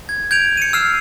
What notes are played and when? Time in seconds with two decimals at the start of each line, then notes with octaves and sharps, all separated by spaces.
0.09 G#6
0.31 G6 G#6 D7 F7
0.57 C#7 D#7
0.73 E6 F6 C7 E7